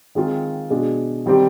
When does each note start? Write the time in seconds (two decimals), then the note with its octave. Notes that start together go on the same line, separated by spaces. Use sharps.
0.15 D#3 G#3 C4 F4
0.70 B2 G#3 D4
1.26 D#3 G3 C4 G4